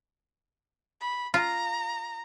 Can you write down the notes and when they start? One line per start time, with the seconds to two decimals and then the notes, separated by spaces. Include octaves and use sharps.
1.01 B5
1.34 F4 A#5